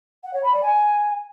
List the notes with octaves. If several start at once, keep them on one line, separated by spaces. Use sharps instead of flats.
F#5
C#5
B5
D5
G#5